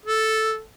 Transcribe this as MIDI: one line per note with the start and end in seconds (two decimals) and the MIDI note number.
0.06 0.61 69